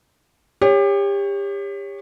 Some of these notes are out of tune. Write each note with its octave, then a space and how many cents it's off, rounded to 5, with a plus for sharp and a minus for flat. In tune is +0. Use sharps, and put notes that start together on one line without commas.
G4 +30 C#5 +0